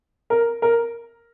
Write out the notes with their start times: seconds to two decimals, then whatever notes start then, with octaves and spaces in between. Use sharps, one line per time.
0.30 A#4
0.62 A#4